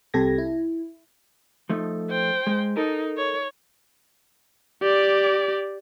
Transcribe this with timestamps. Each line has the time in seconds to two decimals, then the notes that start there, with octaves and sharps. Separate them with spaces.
0.14 C2 C3 G4 A4 G#6 A#6
0.38 E4
1.69 F3 A3 D#4
2.10 C5 G5
2.47 G#3
2.77 D#4 A4 A#4
3.17 C#5
4.82 G4 D5